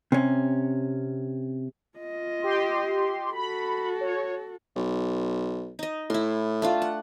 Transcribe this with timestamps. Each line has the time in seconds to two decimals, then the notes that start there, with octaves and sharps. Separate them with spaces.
0.12 C3 C#4
1.98 F4 D#5
2.42 G4 C6
3.32 F#4 A4 B5
4.01 C#5
4.76 B1
5.79 D#4 D#5
6.10 A2 E4 C6
6.62 A3 D4 F4
6.82 F#5